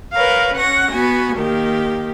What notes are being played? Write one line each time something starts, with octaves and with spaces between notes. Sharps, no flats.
A#4 B4 C#5 F5
C#4 F#5 C#6 A#6
B3 F#4 G#5
D#3 A#3 G4